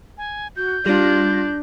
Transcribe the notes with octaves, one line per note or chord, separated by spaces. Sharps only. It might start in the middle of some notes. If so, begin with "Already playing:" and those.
G#5
F#4 G6
G3 D4 F4 C6 A#6